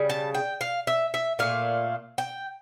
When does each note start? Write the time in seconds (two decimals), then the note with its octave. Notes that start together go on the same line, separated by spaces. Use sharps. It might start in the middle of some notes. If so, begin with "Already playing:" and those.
Already playing: C#3 G3
0.10 A5
0.35 G5
0.61 F5
0.87 E5
1.14 E5
1.39 A#2 A3 F5
2.18 G5